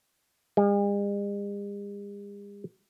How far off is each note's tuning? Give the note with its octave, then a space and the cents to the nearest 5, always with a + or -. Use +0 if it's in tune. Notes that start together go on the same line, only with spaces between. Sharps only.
G#3 -45